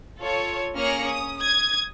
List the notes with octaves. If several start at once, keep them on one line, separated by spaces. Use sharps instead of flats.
F4 A4 C#5
A#3 C#4 G#4 F6 A#6 C#7
C#4 D#6
D#6 G#6